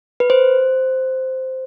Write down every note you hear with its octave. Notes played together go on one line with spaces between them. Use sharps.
B4
C5